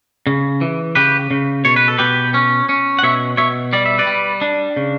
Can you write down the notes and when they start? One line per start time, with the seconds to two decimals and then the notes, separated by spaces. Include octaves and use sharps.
0.27 C#3
0.61 E3
0.95 C#3 G4 B4
1.31 C#3
1.65 B2 C#5
1.76 B4
1.88 A4
1.98 B2 G4 B4
2.34 C#4
2.69 C#4
2.99 F#5
3.03 B2 C#5 E5
3.37 B2 C#5 E5
3.73 G3 D5
3.86 E5
3.98 B4 D5
4.07 G3
4.42 D4
4.77 C#3